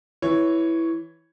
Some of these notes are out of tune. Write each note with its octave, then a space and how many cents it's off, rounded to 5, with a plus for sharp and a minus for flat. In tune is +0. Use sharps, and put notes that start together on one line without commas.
E3 +0 C#5 +0